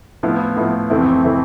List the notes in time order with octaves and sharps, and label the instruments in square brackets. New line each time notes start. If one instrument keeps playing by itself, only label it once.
[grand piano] A2 F3 B3 E4
A2 F3 B3 E4
F2 E3 A3 C4 E4
E3 A3 C4 E4